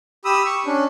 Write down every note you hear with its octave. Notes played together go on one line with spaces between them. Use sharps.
G4 B5 D#6 E6
C#6
C#4 D4